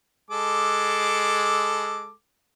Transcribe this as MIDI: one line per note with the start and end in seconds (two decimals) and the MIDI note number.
0.30 2.11 56
0.30 2.11 69
0.30 2.11 86